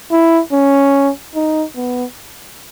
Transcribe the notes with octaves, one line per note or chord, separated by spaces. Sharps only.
E4
C#4
D#4
B3